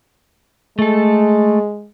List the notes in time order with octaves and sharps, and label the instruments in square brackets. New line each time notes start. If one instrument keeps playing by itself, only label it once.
[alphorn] G#3 [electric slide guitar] A3 A4